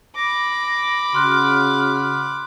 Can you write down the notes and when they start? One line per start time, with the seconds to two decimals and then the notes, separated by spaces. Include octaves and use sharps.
0.16 B5 D6 A#6
1.15 C#3 F#4 C6 F6 F#6